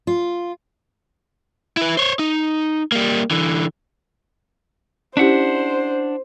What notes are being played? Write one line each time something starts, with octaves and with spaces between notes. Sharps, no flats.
F4
E4 B4
C5 C#5
D#4
G3 A#3
D3 E3
C#4 D4 E4 G4 C5 E5 F#5